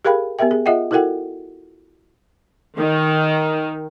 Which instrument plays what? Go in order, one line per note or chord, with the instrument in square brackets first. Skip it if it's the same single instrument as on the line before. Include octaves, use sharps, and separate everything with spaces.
[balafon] G4 G#4 A#4 F5 G5 B5
B3 G4 A#4 E5 G5
G#4
F4 G#4 D#5 E5 F#5 G5
E4 F#4 A4 A#4 F#5 G5
[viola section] D#3